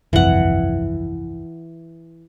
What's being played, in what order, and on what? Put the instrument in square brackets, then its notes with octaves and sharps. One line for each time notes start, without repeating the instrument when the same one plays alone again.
[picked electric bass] G1 C2 F2 [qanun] E3 F#5